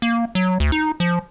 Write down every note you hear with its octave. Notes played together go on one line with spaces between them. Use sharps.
A#3
F#3
D2
D#4
F3